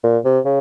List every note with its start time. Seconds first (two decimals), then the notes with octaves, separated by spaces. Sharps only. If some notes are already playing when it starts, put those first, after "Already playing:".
0.04 A#2
0.25 C3
0.45 C#3